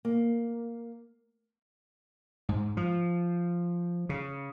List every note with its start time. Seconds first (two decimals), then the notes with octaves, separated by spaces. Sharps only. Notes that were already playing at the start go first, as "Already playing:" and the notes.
0.05 A#3
2.49 G#2
2.77 F3
4.09 C#3